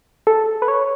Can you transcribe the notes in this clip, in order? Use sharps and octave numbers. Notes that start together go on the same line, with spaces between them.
A4
B4
C#5